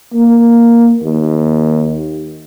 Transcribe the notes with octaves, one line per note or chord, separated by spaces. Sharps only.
A#3
D#2